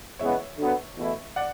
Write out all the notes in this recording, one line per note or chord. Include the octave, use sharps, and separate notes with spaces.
E2 C#3 G#3 B3 C#5 E5
D3 F#3 B3
E2 B2 A3 E4
D5 F#5